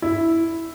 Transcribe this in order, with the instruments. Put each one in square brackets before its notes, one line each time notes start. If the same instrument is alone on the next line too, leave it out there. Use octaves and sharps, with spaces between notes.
[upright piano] E4